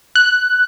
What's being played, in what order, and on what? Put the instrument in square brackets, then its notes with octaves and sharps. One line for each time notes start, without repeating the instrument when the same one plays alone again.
[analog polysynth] F#6